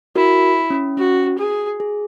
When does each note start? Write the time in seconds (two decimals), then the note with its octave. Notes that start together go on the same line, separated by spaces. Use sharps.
0.16 E4 F#4 A#4
0.70 C#4
0.97 C#4 F#4
1.39 G#4
1.80 G#4